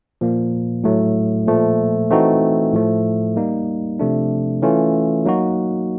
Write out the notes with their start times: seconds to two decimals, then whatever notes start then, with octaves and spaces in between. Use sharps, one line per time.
0.21 A#2 F3 A#3
0.84 A2 F#3 A3
1.47 A#2 F3 A3
2.11 E3 A3 C4 D#4 F#4
2.73 A2 F3 A3
3.36 G3 A#3 D#4
3.99 C3 F3 A3 D4
4.62 E3 A3 C#4 F4
5.25 F#3 A#3 D#4 F#4